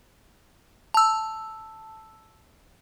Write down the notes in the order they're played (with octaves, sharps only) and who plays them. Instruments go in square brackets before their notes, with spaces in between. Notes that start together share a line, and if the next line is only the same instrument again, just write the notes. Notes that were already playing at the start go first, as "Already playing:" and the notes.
[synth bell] A5 E6